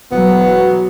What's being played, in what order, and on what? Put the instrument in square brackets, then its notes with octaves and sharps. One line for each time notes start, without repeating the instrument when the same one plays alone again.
[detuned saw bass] E1 [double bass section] F#3 [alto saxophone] B3